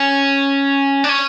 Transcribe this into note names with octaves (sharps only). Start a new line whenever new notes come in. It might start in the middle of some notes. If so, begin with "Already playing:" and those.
Already playing: C#4
D4
C#4